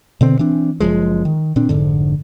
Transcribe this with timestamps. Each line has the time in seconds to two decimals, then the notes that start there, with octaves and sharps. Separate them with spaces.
0.21 B2 D3 C4
0.39 E3 C4 D4
0.80 F#1 F2 F3 G#3
1.25 D#3
1.56 A#2 C4 D4
1.69 F1 G#2 D3